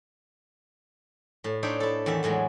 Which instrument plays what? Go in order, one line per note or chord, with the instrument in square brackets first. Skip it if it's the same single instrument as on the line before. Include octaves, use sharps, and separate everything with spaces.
[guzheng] A2
D4 D#4 C5 C#5 E5 G5
E4 A4
E2 D#3 A3 E5
E2 A2 F#3 G#3